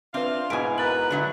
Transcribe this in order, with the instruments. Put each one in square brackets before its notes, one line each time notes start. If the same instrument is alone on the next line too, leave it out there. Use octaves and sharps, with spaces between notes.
[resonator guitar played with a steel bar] C4 [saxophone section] D4 F4 F5 [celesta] B4 E5
[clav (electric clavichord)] G#2 B2 [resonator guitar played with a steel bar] E4 G#5 [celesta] D7
[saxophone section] A#4 B4 [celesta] A#5 A6 F#7
[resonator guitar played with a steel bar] D3 F#3 E4